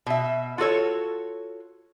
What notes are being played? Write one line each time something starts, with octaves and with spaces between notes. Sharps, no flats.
B2 E5
F4 F#4 A4 C#5